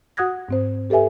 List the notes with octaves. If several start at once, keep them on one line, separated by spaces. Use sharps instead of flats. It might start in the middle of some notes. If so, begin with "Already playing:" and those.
F#4 F#5 D#6 F#6 G#6 A#6
G#2 C4 C5
G4 A4 B4 E5 G#5